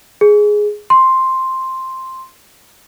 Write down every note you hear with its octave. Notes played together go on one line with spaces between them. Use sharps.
G#4
C6